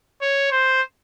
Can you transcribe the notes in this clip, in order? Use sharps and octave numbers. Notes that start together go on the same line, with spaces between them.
C#5
C5